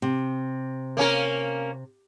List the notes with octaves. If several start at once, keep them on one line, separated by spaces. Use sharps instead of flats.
C3
A#3 C#4 A#4